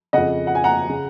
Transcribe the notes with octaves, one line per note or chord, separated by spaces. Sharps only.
F2 C#3 D#5 F#5
F#5
G#5
F#5 A#5
C#3